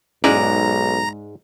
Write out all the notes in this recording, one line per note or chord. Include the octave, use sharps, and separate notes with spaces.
B1 G#2 G#3 C#4 E4 B4 D5 A#5